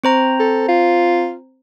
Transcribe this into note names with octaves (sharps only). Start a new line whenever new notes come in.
C4 C5 A#5
A4
F4